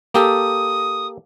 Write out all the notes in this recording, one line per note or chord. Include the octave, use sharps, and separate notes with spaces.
A#3 G4 A4 D#6